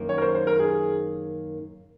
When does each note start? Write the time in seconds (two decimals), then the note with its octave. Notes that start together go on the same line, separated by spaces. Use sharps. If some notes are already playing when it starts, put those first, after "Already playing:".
Already playing: F#2 D#3 A#3
0.09 C#5
0.18 A#4
0.22 C5
0.35 C5
0.47 A#4
0.59 G#4